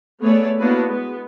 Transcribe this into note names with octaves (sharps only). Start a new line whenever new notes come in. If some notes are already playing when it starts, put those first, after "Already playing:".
A3 B3 G#4 C#5 D5 E5
A#3 B3 D4 E4 F#4 B4
G#3 B3